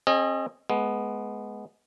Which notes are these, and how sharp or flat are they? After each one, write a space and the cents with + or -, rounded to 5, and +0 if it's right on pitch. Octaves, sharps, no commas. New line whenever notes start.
C4 +45 G#4 +30 D#5 +0
G#3 +25 B3 +0